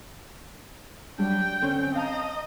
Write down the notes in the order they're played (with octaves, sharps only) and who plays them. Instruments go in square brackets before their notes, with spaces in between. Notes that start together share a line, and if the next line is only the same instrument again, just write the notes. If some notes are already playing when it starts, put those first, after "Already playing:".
[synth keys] F#3 G3 D4 [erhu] G5
[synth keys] D3 C4 C#4
[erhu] D#5 [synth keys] F5 A5 A#5